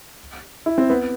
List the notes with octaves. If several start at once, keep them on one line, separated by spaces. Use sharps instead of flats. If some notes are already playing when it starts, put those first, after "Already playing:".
E4
C4
B3